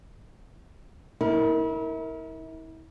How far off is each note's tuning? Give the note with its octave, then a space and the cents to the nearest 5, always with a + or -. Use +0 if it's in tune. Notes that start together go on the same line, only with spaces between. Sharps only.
E4 -35 A#4 +0